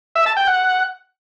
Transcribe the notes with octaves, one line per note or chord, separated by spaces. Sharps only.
E5
A5
G5
F#5